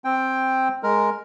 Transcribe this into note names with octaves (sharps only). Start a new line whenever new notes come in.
C4 G5
G#3 A#4